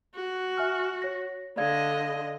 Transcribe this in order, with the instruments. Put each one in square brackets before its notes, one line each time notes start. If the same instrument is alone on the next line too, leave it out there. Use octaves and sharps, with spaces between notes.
[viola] F#4
[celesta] E5 G#5 F6
C#5 A#6
[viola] D3 D#5 [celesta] D5 F5 G#6